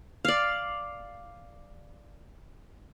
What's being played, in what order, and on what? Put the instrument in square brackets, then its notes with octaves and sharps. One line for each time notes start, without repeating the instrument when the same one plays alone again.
[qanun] D5 F5